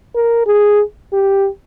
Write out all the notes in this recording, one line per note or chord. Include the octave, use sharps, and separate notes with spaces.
A#4
G#4
G4